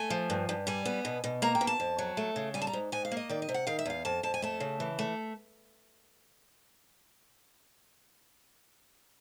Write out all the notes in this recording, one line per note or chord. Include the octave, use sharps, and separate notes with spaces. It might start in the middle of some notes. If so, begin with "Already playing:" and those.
Already playing: A3 G#5
F3
G2
G2
G3 G#5
B3
B2
B2
A#3 A#5
G5
B2
A5
F2
F#3
A3
C#3
G3 G#5
A5
A#5
G#2
G#2 G#5
F5
A#3
D#5
D#3 D5
D#5
C3
F#5
D#3 F5
E5
E2 F5
F2 A5
F2 A5
G#5
A3 A5
C#3
E3
A3